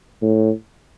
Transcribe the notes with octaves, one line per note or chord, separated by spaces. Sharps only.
A2